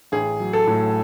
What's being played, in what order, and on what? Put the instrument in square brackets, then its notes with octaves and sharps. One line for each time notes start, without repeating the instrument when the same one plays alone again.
[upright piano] A1 G#4
F#3
A4
A2